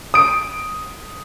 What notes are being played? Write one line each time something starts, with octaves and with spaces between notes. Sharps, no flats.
D#6 D7